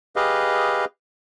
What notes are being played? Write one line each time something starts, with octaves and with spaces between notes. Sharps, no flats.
G4 G#4 B4 D#5 F5